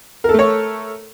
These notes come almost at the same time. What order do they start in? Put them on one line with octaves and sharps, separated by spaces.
A#4 A4 A3 C#5